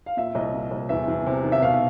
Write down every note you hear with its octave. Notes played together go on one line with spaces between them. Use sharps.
F5
A#2 E5
C2 D#5
A#2
C2
E2 E5
E2
C3
D#3
E5
B2 F5